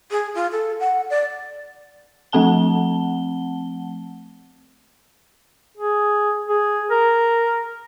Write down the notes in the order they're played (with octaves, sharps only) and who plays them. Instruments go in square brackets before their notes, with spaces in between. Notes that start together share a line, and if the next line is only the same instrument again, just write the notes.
[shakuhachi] G#4
F4
A4
F#5
D5
[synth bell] F3 A3 C4 F#5 A5 G7
[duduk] G#4
G#4
A#4